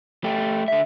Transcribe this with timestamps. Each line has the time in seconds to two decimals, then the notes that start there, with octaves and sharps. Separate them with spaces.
0.24 A3 G4
0.68 D3 E5